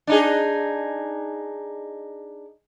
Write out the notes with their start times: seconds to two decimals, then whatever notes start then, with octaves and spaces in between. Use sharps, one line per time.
0.07 D4 D#4 G#4